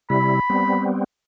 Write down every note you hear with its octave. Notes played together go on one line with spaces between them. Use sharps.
C3 G3 E4 B5
G3 B3 C4